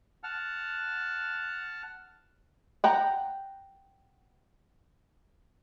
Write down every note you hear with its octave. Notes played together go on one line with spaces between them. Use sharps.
F#5 A5 F6
F#5 G5 A#5